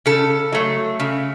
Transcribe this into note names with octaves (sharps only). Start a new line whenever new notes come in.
C#3 A4
F#3 A3
C#3